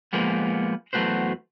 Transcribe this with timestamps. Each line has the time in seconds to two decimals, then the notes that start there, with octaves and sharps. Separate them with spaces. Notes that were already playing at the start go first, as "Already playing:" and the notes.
0.13 F3 G#3 A#3 B3
0.93 E2 F#3 A3 F#4 B4 C5